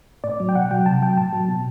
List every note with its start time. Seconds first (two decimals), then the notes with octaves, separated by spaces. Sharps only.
0.24 A2 D5
0.40 F#3
0.49 G5
0.55 B2 F#5
0.71 F#3 G5
0.86 C3 A5
1.02 F#3 G5
1.17 A2 A5
1.33 F#3
1.49 B2